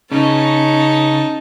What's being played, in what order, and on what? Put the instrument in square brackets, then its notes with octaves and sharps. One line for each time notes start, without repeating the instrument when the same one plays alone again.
[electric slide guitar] C#3 [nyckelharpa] C#4 B4 [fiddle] D#4 A5